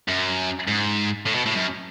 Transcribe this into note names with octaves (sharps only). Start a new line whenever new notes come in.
F#2
G#2
A2
B2
A2
F#2